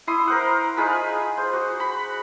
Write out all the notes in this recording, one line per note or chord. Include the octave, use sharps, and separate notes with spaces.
E4 C6 D#6
A#4 C5 F#5
D#4 F4 G#4 B5
C5
F#4
B5